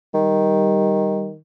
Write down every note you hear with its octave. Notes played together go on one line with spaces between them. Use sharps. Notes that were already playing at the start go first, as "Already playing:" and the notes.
D#3 G3